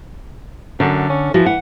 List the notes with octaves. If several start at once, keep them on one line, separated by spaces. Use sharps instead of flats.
F#2 D3
C#4
E3 F3 F#4
F#5